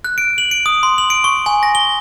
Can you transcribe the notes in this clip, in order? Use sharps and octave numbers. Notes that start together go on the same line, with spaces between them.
F#6
D7
F#7
D7
D#6
C6
F#7
D7
C#6
G#5
A#6
G7